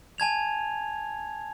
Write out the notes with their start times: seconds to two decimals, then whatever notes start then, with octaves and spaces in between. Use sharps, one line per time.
0.18 G#5 A5 G#6 F7